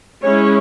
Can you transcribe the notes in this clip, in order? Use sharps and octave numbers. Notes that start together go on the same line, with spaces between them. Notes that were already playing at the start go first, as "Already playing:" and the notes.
G#3 C#4 E4 C#5